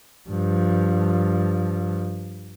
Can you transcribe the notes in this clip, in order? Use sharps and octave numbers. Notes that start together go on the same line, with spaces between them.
G2 F3